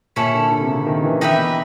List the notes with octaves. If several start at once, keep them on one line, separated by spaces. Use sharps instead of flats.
A#2 C#4 E4 A4 C#5
D3
D3
C3
C#3
D#3
E3
E3 D#4 G4 B4 E5
B2